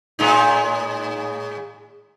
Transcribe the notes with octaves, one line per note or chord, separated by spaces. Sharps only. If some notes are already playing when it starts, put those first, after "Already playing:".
A2 G#3 D#4